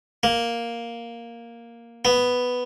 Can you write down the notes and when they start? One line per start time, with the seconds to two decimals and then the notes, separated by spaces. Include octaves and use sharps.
0.23 A#3
2.05 B3